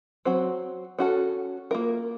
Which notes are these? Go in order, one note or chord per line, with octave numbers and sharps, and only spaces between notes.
F#3 C4 F#4
C#4 F#4 A4
A#3 F4 A#4